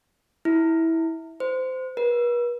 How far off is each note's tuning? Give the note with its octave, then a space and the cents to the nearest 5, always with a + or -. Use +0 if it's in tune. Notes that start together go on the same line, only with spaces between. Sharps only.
E4 -15
C5 -20
B4 -45